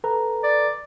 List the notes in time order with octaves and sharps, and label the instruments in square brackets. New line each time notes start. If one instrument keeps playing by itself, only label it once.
[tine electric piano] A4 B4 A#5
[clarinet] D5